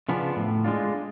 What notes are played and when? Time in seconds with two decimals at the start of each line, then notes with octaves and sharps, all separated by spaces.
0.09 C#3 F3 B3 D4
0.36 A2
0.64 G#3 D4 F4